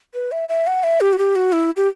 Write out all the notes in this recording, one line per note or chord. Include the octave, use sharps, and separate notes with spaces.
B4
E5
E5
F#5
E5
G4
F#4
G4
F#4
E4
G4